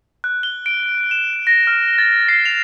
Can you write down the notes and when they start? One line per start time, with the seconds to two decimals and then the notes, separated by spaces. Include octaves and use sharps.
0.24 F#6
0.43 G7
0.66 D7
1.11 E7
1.47 A#6
1.67 F6
1.98 A6
2.29 C7
2.45 F7